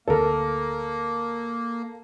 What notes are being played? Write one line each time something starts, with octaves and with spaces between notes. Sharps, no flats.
D1 D2 D3 A#3 A4 A#4